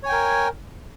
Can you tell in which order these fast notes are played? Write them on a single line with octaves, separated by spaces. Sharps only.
C#5 G#5 G5 A#4